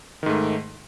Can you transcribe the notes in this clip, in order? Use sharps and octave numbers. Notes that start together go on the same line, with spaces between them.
G#2 D#3 A3